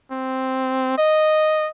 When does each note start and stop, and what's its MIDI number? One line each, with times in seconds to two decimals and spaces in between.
0.12 0.97 60
0.98 1.69 75